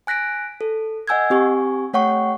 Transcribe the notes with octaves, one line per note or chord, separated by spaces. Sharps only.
G#5 F#6 A#6 B6 D7
A4
D#5 F#5 G#5 E6 G6 G#6
C4 G4 G#5 C#6
A3 C#5 F#5 G5 C#6